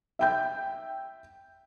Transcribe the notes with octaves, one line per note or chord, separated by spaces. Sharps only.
E5 G5 G6